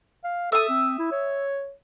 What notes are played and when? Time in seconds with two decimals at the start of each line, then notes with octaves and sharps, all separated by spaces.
0.24 F5
0.52 A4 E5 D#6
0.69 C4
0.99 E4
1.11 C#5